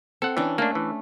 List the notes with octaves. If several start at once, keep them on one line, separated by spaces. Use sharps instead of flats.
C4 A4 F#5
E3 C#4 D4
A3 A#3 D4
E3